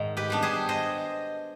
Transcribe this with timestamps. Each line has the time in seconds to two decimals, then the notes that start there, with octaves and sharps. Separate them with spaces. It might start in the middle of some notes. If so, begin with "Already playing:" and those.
Already playing: G#2 D#3
0.17 G4 B4
0.30 G3 B3 D4
0.43 G#4 C5
0.69 C5 D#5